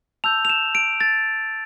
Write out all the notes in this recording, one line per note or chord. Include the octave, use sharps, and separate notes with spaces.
A5 E6 G6 F7
F7
E7
D7
A6